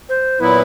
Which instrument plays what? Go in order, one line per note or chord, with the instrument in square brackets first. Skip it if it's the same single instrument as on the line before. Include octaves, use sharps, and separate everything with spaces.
[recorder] C5
[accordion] A#2 F#3 B3 E4 [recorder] B4